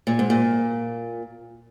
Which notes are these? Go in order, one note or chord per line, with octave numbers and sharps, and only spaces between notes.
A#2
G#2
A#2